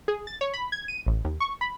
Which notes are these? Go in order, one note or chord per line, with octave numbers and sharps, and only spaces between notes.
G#4
A6
C#5
B5
G#6
D#7
A1
D#2
C#6
B5